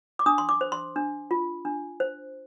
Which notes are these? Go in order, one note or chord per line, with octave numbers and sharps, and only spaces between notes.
D6
D4 D#6
C6
D6
C5
C6
D4
F4
D4
C5